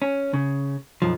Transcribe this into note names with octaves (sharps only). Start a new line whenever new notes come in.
C#4
C#3
B1 F#2 F3